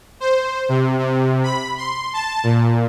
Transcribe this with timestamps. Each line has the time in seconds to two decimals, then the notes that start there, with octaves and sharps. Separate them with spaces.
0.20 C5
0.69 C3
0.99 C3
1.44 B5
1.77 C6
2.13 A5
2.44 A#2